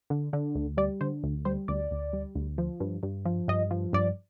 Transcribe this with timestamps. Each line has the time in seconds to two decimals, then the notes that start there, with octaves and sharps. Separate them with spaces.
0.10 D3
0.33 D3
0.55 D2
0.77 G3 D5
1.01 D3 C5
1.23 D2
1.45 G3 C5
1.68 D2 D5
1.91 D2
2.13 G3
2.35 D2
2.58 F3
2.80 G2
3.03 G2
3.25 F3
3.48 G2 D#5
3.71 F3
3.93 G2 D5